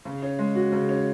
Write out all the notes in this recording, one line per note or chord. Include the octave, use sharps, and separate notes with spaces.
C#3
C#4
G#3
F#4
C#3
C#4